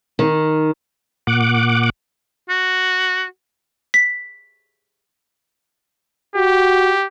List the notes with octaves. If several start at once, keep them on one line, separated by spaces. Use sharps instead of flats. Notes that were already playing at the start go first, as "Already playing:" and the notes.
D#3
A#2 F#5 D6
F#4
B6
F#4 G4